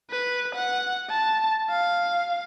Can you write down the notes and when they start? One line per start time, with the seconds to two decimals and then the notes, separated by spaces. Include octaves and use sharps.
0.11 B4
0.55 F#5
1.09 A5
1.70 F5